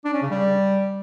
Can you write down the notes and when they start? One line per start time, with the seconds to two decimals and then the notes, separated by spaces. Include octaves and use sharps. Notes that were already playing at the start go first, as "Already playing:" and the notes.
0.05 D4
0.13 C#4
0.22 C#3
0.31 G3